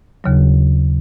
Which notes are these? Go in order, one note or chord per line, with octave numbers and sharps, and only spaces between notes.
D#2 C#3 F#3